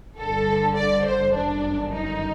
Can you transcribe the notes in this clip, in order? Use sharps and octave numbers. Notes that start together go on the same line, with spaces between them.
G1 G2 D3 A4
D5
C5
G1 F#2 D#3 D4
D#4